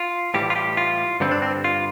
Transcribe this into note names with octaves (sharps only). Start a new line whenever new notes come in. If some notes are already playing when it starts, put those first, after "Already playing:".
Already playing: F4
A2 E3 G3 G4
F4
G4
F4
G2 D3 G3 C4
D4
C4
F4